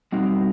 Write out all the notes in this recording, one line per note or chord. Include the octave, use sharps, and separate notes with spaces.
B2 G3 C4 D#4 F#4